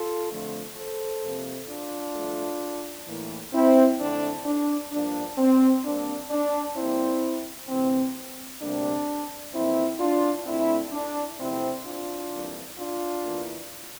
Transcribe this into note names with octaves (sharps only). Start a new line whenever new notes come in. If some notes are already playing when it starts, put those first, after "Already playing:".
Already playing: F4 A4
F2 D3 F3 A3
A4 C5
F2 C3 F3 A#3
D4 F4
G2 F3 A3
A2 E3 A#3
C4 E4
F2 D3 A3 D4
D4
G2 F3 A#3 D4
C4
A#2 G3 A#3 D4
D4
A#2 G3 A#3 C4 E4
D2 C3 E3 C4
D2 C3 G3 A#3 D4
F2 E3 A#3 C4 E4
D4 F4
D2 D3 A3 C4 E4
D4
E2 C3 F3 A3 C4 E4
D4 F4
F2 E3 G3 A#3
D4 F4
E2 E3 A#3